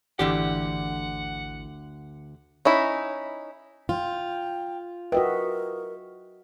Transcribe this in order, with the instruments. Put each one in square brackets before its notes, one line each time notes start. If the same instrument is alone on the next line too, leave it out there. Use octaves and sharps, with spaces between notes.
[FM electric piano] G#1 E3 [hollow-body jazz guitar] D2 D3 G4 [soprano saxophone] F#5
[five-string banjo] C#4 D#4 E4
[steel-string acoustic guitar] F4 [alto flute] G5
[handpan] F#4 D#5 E5 [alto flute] A#4 [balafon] B4 G5